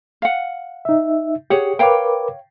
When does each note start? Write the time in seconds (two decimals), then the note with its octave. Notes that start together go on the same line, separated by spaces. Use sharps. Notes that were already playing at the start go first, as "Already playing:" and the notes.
0.22 F5 F#5
0.85 D#4 E5
1.50 G4 G#4 C#5 F#5
1.79 A#4 B4 C#5 F5 G5 D6